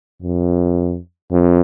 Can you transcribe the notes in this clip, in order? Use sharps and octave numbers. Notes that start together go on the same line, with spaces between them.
F2
F2